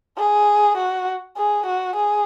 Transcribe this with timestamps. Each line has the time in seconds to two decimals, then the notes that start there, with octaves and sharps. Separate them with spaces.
0.18 G#4
0.78 F#4
1.37 G#4
1.66 F#4
1.96 G#4